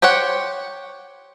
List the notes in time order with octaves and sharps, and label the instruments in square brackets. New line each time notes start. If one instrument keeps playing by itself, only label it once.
[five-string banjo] G4 C5 C#5 F#5